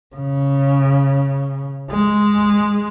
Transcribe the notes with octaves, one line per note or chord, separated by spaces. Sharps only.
C#3
G#3